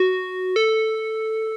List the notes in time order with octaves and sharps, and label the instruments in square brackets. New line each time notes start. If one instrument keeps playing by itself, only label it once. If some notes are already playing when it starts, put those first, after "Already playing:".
Already playing: [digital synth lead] F#4
A4